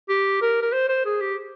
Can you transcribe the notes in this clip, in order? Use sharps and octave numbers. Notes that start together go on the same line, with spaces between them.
G4
A#4
A#4
C5
C5
G#4
G4